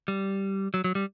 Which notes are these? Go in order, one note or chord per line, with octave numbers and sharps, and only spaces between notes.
G3
F#3
F#3
G3